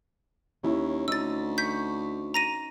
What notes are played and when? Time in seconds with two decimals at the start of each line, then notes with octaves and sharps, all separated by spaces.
0.63 D#2 C#4 E4
1.08 D2 D#4 E6 A6 D#7
1.58 C#6 G6 B6
2.34 A#5 A#6 D#7